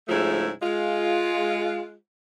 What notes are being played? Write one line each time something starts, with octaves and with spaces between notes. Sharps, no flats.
G#2 C#3 F3 A3 E4
G#3 F4